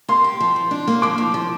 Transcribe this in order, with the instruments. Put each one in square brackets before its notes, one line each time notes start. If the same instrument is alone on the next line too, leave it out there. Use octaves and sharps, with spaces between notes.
[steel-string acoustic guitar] A#3 [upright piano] C6
[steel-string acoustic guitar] G4
F3
F3
D4
A#3
[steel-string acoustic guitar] F3 [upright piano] D6
[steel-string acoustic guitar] F3
F3